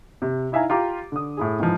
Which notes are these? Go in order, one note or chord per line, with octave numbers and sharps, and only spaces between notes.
C3
D#4 E4 E5 F5 G#5 A#5
F4 G4 A#5 D6
D3 D#6
A2 E4 G#4
G#2 E3 F3